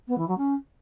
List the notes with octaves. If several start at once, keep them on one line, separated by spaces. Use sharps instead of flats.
B3
E3
F#3
C#4